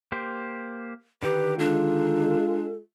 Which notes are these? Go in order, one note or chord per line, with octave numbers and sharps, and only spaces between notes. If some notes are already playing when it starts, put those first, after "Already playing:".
A#3 G4 C5
D3 D#3 G4 B4 G5
G#3 D4 F4 A4